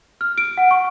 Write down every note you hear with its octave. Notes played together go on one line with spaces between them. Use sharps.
F6
D7
F#5
C#6